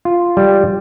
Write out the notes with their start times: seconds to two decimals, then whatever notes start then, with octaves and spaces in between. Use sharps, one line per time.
0.05 F4
0.37 G3